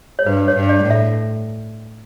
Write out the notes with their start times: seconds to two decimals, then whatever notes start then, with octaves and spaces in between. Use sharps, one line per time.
0.19 C#5
0.26 G2 B4
0.37 B4
0.48 C#5
0.55 G2
0.69 D5
0.83 A2
0.90 E5